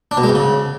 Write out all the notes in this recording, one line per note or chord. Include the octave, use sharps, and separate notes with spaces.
D4
B2
G#3
G#2
C#3